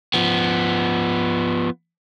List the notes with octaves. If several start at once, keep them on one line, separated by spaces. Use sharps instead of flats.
F3 B3